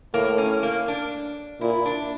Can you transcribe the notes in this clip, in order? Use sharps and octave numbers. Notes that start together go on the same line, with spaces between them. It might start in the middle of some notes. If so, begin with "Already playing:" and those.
A2 A#3
C#4
A#3
D4
A#2 E4
D4